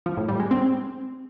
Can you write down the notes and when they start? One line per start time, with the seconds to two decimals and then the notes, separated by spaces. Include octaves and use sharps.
0.06 F3
0.17 A2
0.28 G3
0.40 G#3
0.51 C4